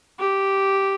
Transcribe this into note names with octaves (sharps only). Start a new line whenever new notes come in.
G4